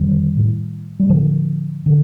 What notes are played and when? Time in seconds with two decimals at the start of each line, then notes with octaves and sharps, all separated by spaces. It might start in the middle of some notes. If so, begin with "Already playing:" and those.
Already playing: F2 D3 D#3 G3
0.37 A2
1.00 G3
1.09 A2 D3 F3
1.86 D3